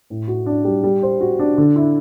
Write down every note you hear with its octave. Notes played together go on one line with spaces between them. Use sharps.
A2
F#4
D4
G3
G3
C5
F#4
D4
D3
E4